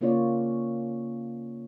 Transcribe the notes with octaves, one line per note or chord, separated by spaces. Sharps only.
C#3 A#3 C#4 F4 C#5 D5